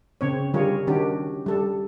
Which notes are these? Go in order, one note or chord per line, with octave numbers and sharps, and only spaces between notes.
C#3 C4 C#5
D3 G3 F4 G#4 A#4 C#5
D#3 C#4 D4 F#4 G4
G3 A4